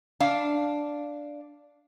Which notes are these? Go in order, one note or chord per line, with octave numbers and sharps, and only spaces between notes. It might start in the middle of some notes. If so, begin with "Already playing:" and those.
D4 F5